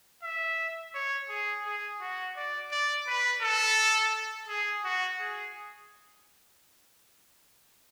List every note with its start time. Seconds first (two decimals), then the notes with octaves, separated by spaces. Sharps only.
0.23 E5
0.95 C#5
1.29 G#4
1.65 G#4
2.00 F#4
2.36 D5
2.71 D5
3.07 B4
3.42 A4
4.48 G#4
4.84 F#4
5.19 G#4